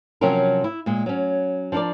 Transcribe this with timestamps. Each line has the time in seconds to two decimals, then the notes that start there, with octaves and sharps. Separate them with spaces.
0.21 C3 F3 F#3 C#4 F4 A#4
0.64 E4
0.86 A#2 G#3
1.06 F#3 C#4
1.72 F3 D4 F#4 A#4 D5